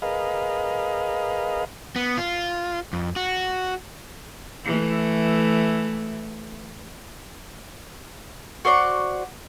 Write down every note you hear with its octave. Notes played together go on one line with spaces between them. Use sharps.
G#4 A#4 B4 D#5 F5
B3
F4
F2
F#4
E3 A3
F#4 C5 D5 C#6